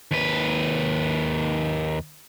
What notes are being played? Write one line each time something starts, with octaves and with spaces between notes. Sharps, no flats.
D#2 B4